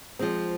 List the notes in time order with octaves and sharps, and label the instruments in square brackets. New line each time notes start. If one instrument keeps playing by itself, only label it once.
[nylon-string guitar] F3 G#3 C4